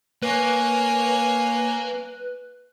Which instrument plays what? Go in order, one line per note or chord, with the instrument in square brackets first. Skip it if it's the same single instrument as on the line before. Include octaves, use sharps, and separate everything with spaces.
[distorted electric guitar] A#3 [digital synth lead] B4 [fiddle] C#5 G#5